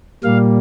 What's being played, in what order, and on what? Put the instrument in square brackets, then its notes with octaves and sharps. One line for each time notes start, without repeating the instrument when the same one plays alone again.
[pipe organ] A#2 G3 A#3 F5